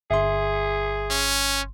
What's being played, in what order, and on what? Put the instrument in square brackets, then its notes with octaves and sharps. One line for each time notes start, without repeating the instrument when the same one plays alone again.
[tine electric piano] G1 C6 [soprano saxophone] G#4 [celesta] E5
[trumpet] C#4